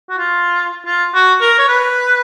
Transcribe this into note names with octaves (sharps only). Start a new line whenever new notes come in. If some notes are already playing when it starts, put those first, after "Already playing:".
F#4
F4
F4
F#4
A#4
C#5
B4